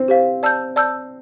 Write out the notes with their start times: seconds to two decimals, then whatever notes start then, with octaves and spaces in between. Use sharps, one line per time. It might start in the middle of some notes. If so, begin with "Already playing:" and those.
Already playing: C4
0.08 G4 C5 F5
0.43 D5 A5 E6 G6
0.76 D5 A5 E6 G6